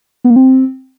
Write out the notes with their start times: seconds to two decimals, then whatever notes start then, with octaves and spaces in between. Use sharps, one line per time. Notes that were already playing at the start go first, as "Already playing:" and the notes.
0.24 B3
0.30 A#3
0.36 C4